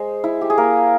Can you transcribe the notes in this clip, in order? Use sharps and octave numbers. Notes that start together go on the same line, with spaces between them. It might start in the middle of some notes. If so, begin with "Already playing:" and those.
Already playing: G#3 C5
E4
G4
G#4
A#3 A#4